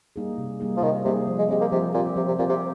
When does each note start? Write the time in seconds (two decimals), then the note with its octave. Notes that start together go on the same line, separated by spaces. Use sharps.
0.16 G3 A#3 D#4 G#4
0.38 C3
0.60 G3 A#3 D#4 G#4
0.77 F3
0.82 C3 D#3
1.05 C3 G3 A#3 D#4 G#4
1.27 F3
1.38 G#3
1.49 G#3 C4
1.53 G4
1.61 A#3
1.72 C3 F3
1.94 A#2 C4 G4
2.16 C3 F3
2.27 C3
2.39 A#2 C4 G4
2.49 C3